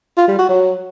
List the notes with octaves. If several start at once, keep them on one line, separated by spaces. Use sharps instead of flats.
F4
G3
F#4
F#3